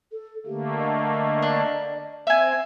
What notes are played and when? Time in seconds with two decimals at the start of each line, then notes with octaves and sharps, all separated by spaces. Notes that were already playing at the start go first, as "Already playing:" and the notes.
0.12 A4
0.46 D3 A3 A#3 G4
0.79 D#5
1.42 D4
2.27 C4 E5 G#5